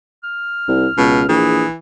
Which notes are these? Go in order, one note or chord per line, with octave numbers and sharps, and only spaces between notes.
F6
C2
C#2 B2
A#1 E3 G#4